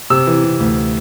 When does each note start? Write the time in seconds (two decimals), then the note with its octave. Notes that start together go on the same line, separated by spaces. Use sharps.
0.10 C3 E6
0.27 E3
0.44 C3
0.60 D2